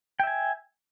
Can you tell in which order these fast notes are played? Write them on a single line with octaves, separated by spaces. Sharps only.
G5 E5 G#5